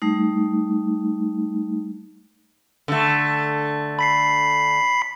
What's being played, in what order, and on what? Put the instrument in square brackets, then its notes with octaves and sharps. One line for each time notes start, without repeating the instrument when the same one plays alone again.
[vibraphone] G3 A3 D#4
[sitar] D3 A3
[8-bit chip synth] B5 B6 C7